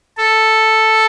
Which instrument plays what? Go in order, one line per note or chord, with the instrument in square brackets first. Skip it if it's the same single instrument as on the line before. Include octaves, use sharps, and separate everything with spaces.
[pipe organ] A4